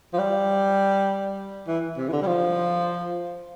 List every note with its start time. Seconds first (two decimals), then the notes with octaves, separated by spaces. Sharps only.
0.13 F3
0.18 G3
1.68 E3
1.97 C3
2.08 E3
2.12 D3
2.22 G3
2.27 F3